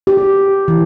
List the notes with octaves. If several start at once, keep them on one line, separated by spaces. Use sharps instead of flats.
G4
E3